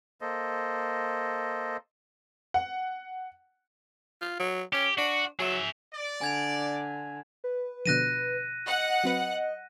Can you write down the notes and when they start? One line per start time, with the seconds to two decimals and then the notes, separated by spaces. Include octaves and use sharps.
0.21 A#3 A4 C5 D#5
2.54 F#5
4.21 F4
4.40 F#3
4.73 C#4 G4
4.98 D4 F#4
5.39 F#3 G#4 E5
5.92 D5
6.21 D3 G#5 G#6 F7
7.44 B4
7.86 B2 D3 F3 F#6 A#6 D#7
8.67 D#5 F#5
9.04 F#3 C4 B4